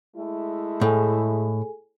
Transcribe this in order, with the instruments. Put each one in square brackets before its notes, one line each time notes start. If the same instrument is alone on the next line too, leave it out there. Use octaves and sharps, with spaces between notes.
[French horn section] G#3 A3 E4
[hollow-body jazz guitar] A2 [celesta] G#4 A4 G#5